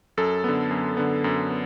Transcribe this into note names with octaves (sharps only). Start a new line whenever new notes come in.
F#2 A4
D3 B3
F#2
D3 B3
F#2
B3